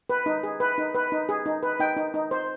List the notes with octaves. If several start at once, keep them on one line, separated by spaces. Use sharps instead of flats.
B4
D#4
G#4
B4
D#4
B4
D#4
G#4
D#4
B4
D#4 G5
D#4
D#4
C5